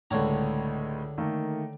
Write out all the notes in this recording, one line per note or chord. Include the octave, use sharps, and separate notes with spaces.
C#2 A2 D3 C#5 A#5
D#3 A3 A#3